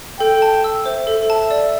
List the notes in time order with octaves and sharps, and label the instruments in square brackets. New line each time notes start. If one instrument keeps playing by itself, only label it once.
[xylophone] A4 [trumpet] G5
[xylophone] A5
E6
[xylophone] C5 [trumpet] E5
[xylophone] A4
A5
D5